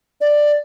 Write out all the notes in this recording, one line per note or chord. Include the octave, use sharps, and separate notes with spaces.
D5